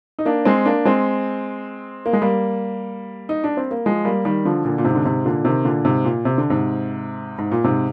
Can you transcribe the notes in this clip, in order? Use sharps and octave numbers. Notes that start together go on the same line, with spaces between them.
D#4
A#3 D4
G#3 C4
A#3 D4
G#3 C4
A#3
G#3
G3 A#3
D#4
D4
C4
A#3
F3 G#3
G3 A#3
D#3 G3
D3 F3
A#2 D3
A#2
G#2 C3
D3
G#2 C3
A#2 D3
C3 D#3
A#2 D3
G#2 C3
A#2
C3
D3
G#2 C3
G#2
A#2
G#2 C3